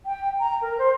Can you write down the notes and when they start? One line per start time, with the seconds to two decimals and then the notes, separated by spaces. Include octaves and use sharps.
0.05 G5
0.39 A#5
0.61 A#4
0.78 C5